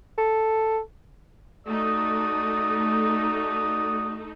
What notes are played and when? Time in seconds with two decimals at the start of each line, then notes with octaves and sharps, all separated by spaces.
0.18 A4
1.67 A3 D#4 F#4 D5 D#6